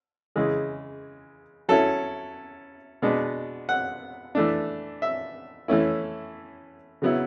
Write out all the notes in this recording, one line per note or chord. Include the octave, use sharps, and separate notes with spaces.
C#3 E3 G#3
F#3 C#4 E4 A4
B2 G#3 B3 D4
F#5
E3 A3 D4
E5
E3 A3 C#4 E4
C#3 F#3 B3 E4